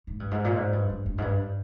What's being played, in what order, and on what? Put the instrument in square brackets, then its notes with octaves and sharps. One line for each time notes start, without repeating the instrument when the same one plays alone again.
[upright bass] G#2
G2
G#2
A#2
G#2
G2
G2
G2
G#2
G2